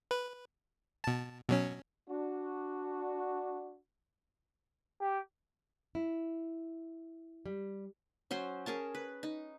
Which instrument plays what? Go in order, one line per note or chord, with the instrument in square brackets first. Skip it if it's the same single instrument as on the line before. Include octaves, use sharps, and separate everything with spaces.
[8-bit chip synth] B4
B2 A5
B2 F#3 C#4
[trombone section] D4 F#4
[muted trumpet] G4
[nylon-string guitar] E4
G3
[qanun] F#3 C#4 C5 C6
C#4 G#4 A#4 A5
B4
D#4